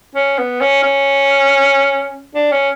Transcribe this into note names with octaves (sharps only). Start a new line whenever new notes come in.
C#4
B3
C#4
C#4
D4
C#4